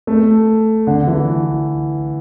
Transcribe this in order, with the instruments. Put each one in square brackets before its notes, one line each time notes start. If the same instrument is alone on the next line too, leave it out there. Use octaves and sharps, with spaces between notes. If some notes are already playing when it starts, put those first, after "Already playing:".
[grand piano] A3
D3
E3